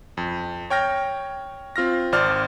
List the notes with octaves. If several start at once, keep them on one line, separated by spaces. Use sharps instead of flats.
F2
C#5 G5 F6 A#6
C4 F4 F6 A#6
G#1 C5 D5 F6